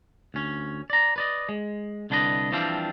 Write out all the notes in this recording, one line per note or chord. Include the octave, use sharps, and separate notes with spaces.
D2 C#4
D5 A#5
B4 D5 D#5
G#3
C2 D3 D4 B4 D#5
E3 F3 G3 C4 D4 F4